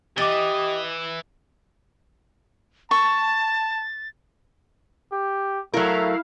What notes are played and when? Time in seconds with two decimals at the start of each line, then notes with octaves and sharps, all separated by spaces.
0.18 E3 G4 D#5 D6 A6
2.91 A5 C#6 A6
5.12 G4
5.74 F#3 A3 E4 A#4 F5